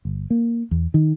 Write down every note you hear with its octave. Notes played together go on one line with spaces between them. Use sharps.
G1
A#3
E2
D#3